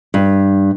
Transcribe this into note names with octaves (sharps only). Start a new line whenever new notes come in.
G2